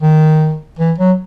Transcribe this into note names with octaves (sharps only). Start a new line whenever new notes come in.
D#3
E3
F#3